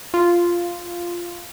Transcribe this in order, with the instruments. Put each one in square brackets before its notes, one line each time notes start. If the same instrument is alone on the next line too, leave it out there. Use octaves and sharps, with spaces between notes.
[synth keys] F4